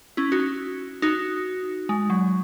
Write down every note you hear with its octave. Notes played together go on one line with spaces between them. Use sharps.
C#4 E4
D#4 F#4
D#4 F#4
G#3
F#3